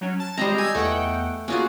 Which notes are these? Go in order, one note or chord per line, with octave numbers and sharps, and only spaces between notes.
F#3 C#4
A5
G3 G#3 C4 D#5 A#5
G#5 E6 G6 G#6
E2 A3 F#5 G5
A#3 C#4 F4 F#4 G#4